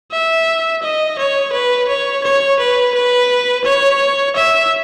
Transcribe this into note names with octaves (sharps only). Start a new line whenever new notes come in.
E5
D#5
C#5
B4
C#5
C#5
B4
B4
C#5
E5